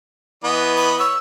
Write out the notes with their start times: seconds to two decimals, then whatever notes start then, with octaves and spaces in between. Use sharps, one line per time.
0.44 E3 B3 D#5
0.77 B5
0.99 C#5 E6